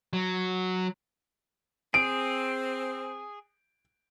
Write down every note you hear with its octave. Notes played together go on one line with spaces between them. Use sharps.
F#3
C4 G#4 D7